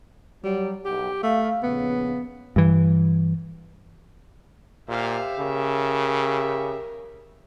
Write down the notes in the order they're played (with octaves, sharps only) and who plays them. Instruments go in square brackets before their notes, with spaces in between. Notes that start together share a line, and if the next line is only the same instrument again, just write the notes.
[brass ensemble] F#3 [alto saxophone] G3
[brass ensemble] B1 F#5 G5 [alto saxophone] G4
[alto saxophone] A3 [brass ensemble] F5
[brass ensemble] A#1 C#3 [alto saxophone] B3
[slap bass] G2 E3
[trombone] A#2 [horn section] G4 E5 [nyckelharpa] C5 F5
[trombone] C#3 [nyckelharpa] A#4